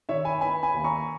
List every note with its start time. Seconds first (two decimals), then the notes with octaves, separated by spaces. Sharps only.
0.09 D#3 C#5 E5
0.25 G#5 B5
0.41 B3 G#5 B5
0.63 G#5 B5
0.74 D#2
0.84 A#5 C#6